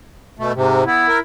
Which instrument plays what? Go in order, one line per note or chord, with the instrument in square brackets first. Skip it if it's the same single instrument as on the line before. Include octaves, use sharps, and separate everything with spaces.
[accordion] B2 A3
G#2 C3
[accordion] B3 [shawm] E4
[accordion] A#4